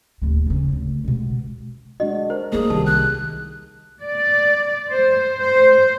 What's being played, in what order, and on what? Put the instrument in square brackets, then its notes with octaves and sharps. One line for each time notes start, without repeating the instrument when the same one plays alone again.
[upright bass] D#1 D2
E2 C#3
D2
B2 G#3
[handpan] G#3 D4 F#4 [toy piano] D#5
[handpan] A#4 [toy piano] C5
[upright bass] A#3 D#4 [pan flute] G#4
[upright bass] C2 [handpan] D#3 D#4 G4 [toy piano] A5
[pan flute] F#6
[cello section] D5
C5
C5